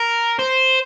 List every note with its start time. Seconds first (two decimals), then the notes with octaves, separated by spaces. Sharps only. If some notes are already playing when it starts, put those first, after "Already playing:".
Already playing: A#4
0.39 C5